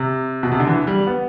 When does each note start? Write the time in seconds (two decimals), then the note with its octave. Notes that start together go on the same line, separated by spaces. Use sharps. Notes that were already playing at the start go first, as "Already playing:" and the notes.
Already playing: C3
0.43 B2
0.52 C3
0.60 D3
0.67 E3
0.87 G3
1.07 B3